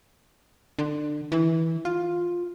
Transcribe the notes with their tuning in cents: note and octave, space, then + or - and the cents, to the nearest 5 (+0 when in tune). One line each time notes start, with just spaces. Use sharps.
D3 +25
E3 -15
F4 +5